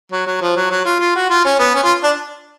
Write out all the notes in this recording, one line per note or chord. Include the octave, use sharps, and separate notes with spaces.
F#3
F#3
F3
F#3
F#3
F4
F4
F#4
F4
C#4
B3
C#4
F4
D4